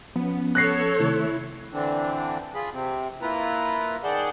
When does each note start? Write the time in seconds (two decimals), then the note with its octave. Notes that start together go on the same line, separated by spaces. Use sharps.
0.16 F3 B3 C#4
0.55 A4 C#5 F#6 A#6 C7
1.00 C3 D#3 A3 E4
1.73 D3 E3 C4 D4
2.55 F4 G#4 B5
2.73 C3 C4
3.22 A#3 E4 F4 B4 A#5
4.04 D#3 G#4 D5 F#5 A5 G6